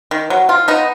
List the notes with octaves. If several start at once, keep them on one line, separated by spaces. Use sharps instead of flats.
D#3
F#3
D#3 F4
B3 D#4